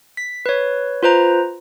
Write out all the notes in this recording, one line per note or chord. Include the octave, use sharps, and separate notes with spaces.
B6
B4 C#5
F4 B4 C5 A#5